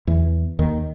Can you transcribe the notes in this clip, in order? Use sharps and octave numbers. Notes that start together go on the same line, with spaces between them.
E2 E3
D#2 D#3